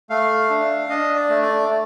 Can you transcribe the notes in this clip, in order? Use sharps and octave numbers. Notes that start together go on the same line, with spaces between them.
A3 F5
D4
D4 D#5
D5
A3
D5
A3